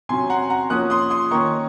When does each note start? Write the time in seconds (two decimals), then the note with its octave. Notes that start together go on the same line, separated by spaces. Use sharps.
0.09 C3 F#3 C#4 G#5 C6
0.30 F#5 A#5
0.50 F#5 A#5
0.70 F3 A#3 C#4 D#6 F#6
0.90 C6 D#6
1.10 C6 D#6
1.31 D#3 A#3 C#4 A#5 C#6